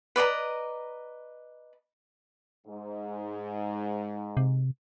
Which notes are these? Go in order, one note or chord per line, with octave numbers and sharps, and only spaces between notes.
B4 D5 D#5 A#5
G#2
C3